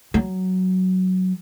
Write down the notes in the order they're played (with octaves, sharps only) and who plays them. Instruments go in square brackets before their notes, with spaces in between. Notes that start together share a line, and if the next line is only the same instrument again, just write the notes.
[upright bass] F#3